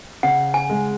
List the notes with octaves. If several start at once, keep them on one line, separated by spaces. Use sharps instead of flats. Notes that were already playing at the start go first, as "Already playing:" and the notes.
C#3 F#5
G#5
G#3